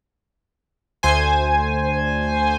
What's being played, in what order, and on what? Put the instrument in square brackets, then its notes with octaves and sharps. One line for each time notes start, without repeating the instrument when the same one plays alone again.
[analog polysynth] D2 C5 G#5